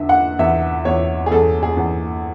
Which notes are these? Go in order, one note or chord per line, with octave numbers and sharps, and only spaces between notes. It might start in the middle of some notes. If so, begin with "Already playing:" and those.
Already playing: E2 D3 E5
F#5
E2 E5
E2 C#5
G#4
E2 A4
G#4
E2